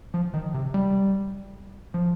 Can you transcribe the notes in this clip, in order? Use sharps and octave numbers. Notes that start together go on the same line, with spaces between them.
F3
D#3
C3
G3
F3